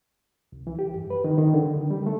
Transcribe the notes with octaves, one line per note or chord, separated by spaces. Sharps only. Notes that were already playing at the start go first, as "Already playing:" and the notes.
C2
E3
G4
G2
B4
D#3
D#3
D3
D#3
G3
A3